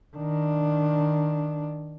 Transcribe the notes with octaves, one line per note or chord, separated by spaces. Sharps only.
D#3 D4